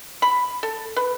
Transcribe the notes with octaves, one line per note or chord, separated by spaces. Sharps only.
B5
A4
B4